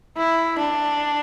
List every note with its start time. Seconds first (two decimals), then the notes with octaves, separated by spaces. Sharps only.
0.17 E4
0.59 D4